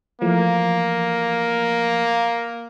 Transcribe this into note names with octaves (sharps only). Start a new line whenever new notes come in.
E3 F3 A3 A#3